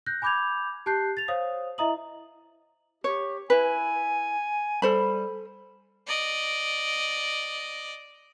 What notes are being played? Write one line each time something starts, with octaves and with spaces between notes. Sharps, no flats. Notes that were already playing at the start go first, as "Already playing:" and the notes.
F#6 G6 A#6
G#5 B5 D6 G6 G#6 F7
G4 A5 F#6 G6 C7
A6 F7
C5 C#5 F5 D#6
E4 D#5 E5 A#5 D#6 F#7
G4 C#5
E4 B4 G#5
G3 A4 C5 B5
D5 D#5